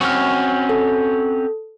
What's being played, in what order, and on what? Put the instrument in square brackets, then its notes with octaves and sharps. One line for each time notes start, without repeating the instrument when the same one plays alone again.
[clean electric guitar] C4 C#4 F#4 [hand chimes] C#6 F6
[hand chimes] A4